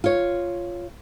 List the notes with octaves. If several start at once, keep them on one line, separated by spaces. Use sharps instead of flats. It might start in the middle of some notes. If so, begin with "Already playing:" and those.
F4 C#5